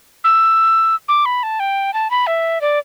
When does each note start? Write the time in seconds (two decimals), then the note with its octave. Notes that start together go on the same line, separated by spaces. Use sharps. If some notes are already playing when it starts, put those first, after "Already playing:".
0.24 E6
1.08 D6
1.26 B5
1.43 A5
1.60 G5
1.94 A5
2.11 B5
2.27 E5
2.61 D5